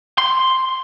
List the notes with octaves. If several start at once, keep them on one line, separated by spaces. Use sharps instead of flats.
C6